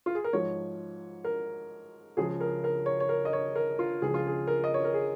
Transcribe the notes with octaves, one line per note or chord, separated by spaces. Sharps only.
F4
G#4
A#4
G#2 F3 C#5
A#4
C#2 C#3 F3 G#4
A#4
A#4
C#5
C#5
A#4
D#5
C#5
A#4
F4
C#2 C#3 F3 G#4
F4
G#4
A#4
D#5
C#5
A#4
G#4